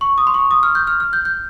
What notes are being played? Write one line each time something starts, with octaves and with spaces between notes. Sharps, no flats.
C#6
D#6
C6
C#6
D#6
F6
G6
F6
F6
G6
G6